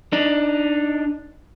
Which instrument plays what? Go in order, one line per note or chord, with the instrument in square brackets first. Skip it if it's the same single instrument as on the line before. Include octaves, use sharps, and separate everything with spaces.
[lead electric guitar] D4 D#4